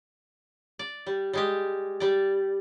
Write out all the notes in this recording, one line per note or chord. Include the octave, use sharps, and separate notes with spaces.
D5
G3
G3 G#3 G4
G3 D5